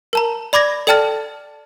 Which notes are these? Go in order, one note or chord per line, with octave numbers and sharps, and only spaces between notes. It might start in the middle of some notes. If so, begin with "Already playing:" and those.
A#4 A5 A#5
D5 B5 D6 G#6 A#6
A4 D5 G5 A5 F6 A6